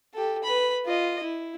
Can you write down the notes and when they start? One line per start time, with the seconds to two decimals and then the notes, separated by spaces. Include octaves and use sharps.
0.14 G4 A4
0.44 B4 B5
0.86 F4 D#5
1.23 E4